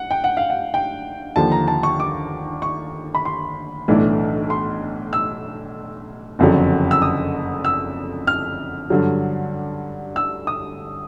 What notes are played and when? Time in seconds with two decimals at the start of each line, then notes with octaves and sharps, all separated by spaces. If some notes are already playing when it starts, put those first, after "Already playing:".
Already playing: F#5
0.11 G5
0.24 F#5
0.37 F5
0.50 F#5
0.74 G5
1.36 D#2 D3 F3 A5
1.52 A#5
1.68 A5
1.83 C#6
2.00 D6
2.62 C#6
3.15 B5
3.25 C6
3.88 B1 A2 E3 A3 D4
4.50 C6
5.13 E6
6.39 F#1 F2 D3 F#3
6.91 E6
7.02 D#6
7.65 E6
8.27 F6
8.90 G2 D3 F#3
10.16 E6
10.47 D#6